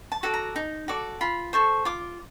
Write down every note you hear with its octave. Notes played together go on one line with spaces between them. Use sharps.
A5
F#4 A4 D5
A#5
D#4
F#4 A4 D5
F4 B5
A4 C5 C#6
F4 D6